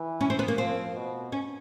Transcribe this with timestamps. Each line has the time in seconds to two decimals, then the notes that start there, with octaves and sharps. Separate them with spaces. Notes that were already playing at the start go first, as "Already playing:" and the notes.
Already playing: E3
0.21 C#4
0.30 C4
0.39 B3
0.48 A#3
0.58 F3 C4
0.95 B2
1.32 C#4